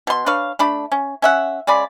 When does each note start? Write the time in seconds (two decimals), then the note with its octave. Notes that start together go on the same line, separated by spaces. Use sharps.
0.07 B2 C6
0.26 D4 B4 C#5 F5
0.59 A3 D4 B5
0.92 C#4
1.22 C#4 E5 F#5
1.67 C#3 G#3 D5 B5